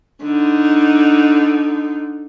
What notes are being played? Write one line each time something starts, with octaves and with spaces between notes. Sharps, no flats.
D3 D#4